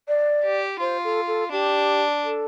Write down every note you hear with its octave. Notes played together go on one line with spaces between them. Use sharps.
D5
G4
F4 C5
A4
A4
D4 G4
A4